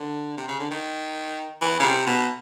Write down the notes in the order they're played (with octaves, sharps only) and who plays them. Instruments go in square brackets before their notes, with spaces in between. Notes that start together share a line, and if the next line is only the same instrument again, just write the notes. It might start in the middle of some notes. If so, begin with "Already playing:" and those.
Already playing: [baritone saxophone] D3
C3
C#3
D3
D#3
E3
C#3
C3
B2